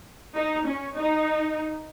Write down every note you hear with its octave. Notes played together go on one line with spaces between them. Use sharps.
D#4
C#4
D#4